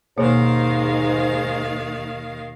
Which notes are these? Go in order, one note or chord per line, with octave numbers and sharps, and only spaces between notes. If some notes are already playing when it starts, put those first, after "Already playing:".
D#2 G#2 B2 D#3 A#3 C#5 F5